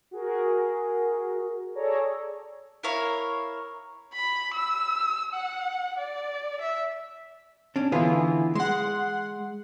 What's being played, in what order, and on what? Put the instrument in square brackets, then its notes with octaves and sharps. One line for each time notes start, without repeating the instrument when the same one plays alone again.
[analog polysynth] F#4 G#4 A#4
G#4 A4 C#5 D5 A#5
[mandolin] E4 A#4 C#5 F5
[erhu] B5
E6
F#5
D5
E5
[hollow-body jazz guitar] C#4 D4
[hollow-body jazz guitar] D3 F4 G#4 [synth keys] E3 B3
[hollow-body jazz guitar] G#3 [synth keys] F#5 C6